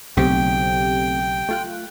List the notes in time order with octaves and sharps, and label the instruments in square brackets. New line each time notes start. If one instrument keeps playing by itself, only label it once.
[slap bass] B1 C#3 [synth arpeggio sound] A3 C4 G4 [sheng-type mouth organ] G5
[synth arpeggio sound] A3 F4 F#6